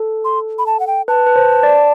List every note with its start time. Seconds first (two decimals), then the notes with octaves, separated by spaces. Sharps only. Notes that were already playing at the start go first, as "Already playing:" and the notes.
Already playing: A4
0.25 C6
0.58 B5
0.66 A5
0.80 F#5
0.87 G5
1.08 B4 A5
1.26 B4
1.36 C5
1.63 D5